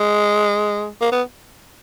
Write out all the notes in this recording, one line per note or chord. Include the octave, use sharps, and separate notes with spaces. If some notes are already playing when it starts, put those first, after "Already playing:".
Already playing: G#3
A#3
B3